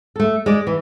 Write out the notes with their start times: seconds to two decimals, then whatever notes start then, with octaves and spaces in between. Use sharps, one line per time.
0.16 A3 A4
0.46 G#3 D5
0.67 E3